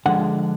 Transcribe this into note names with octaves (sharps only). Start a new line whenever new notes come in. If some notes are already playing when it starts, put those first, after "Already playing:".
D3 F3 G#3 F#5